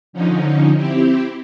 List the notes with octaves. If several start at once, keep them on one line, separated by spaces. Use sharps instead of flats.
D3 F3 C#4 D#4
C4 E4 G4